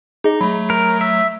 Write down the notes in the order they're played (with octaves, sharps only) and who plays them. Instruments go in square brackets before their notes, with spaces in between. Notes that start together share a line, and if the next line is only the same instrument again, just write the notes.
[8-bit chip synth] D#4 D#5 [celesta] G#4
[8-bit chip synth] F#3 A3 [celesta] B5
[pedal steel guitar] A#4
E5